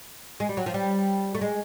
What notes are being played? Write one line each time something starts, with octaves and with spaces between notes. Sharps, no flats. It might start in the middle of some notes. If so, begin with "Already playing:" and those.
G#3
G3
F#3
F3
G3
A3
G#3